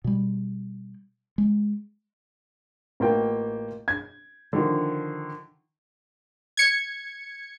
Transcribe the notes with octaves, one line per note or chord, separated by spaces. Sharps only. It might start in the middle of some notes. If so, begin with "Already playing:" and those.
B2 G3
G#3
A1 A#3 F4 G5
G#6
D3 D#3 F3
G#6 C#7